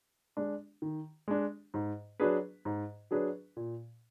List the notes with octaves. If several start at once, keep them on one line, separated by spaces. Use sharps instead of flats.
G#3 D4
D#3
G#3 D4
G#2
F#3 D4 G#4 B4
G#2
F#3 D4 G#4 B4
A#2